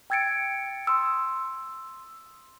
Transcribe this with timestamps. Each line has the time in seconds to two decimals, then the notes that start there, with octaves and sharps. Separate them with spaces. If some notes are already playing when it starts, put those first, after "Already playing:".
0.10 G5 E6 G#6 A6 C#7 D7
0.87 C6 D#6 E6